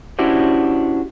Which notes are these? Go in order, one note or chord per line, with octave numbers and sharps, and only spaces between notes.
C#4 D4 E4 F#4 G4 C5